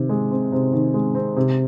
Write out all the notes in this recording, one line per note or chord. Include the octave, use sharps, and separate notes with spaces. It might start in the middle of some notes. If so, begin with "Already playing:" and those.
Already playing: C3 D#3
G#3
C4
C3
D#3
G#3
C4
C3